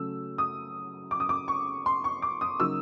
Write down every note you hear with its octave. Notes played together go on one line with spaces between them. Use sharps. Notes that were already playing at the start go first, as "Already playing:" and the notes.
Already playing: C#3 F#3 A3 C#4 E6
D#6
D6
D#6
D6
C#6
C6
C#6
D6
D#6
C#3 F#3 A#3 D#4 E6